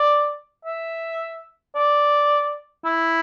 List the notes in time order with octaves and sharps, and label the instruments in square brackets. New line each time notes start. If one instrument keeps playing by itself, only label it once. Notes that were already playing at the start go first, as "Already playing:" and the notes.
Already playing: [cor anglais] D5
E5
D5
E4